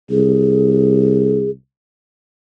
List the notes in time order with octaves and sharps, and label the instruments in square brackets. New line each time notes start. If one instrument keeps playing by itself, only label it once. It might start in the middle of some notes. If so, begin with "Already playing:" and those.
[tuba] C2 [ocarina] G#4